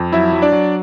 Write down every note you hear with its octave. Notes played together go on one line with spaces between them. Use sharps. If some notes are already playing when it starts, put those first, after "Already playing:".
Already playing: F2
F#3 E4 E5
F#3
D4 D5
F#3